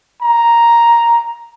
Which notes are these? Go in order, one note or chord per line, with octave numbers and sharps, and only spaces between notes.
A#5